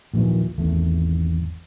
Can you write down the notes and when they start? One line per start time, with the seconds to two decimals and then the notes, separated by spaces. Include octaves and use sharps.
0.14 A#1 D#2 A#2 E3
0.58 G#1 E2 A3